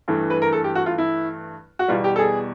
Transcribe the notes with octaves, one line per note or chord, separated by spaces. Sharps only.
G2 E3 A3
B4
A#4
A4
G4
F#4
F4
E4
F#4
E2 B2 G3 F4
G4
A4
G#4